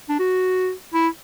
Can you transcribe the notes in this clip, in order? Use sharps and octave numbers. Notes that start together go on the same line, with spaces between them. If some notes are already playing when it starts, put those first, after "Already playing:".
D4
F#4
E4